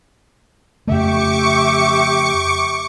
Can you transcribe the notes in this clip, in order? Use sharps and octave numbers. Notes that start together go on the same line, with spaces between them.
F2 C#3 A3 G4 E5 C#6 D6 C#7